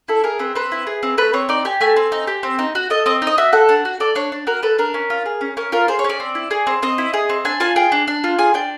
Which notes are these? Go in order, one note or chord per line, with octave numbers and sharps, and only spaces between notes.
E4 A4
G#4 A#4
C4 B4
C4 B4
E4
G#4
C4
A3 B4
C4 C#5
D#4 D5
G4 G#5
A3 G#5
C4
D#4
G4
C4
D#4
F#4
A4 D#5
C4 D#5
D#4
D#5
F#4 E5
A4 F#5
D4
F#4
A4 D5
D4 C#5
D4
F#4 A#4
A4 B4
D4 A#4
C#4
F4
G#4
C#4
C#4 A#4
F4 A#4
G#4 C5
C#5
C#4
D5
C4
E4
G#4
C4
C4 D#5
E4
G#4
C4
D4 G#5
F4 G#5
G#4 G5
D4
D4
F4
G#4 G#5
D4 G5